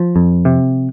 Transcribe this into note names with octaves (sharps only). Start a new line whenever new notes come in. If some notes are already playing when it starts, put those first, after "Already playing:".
Already playing: F3
F2
C3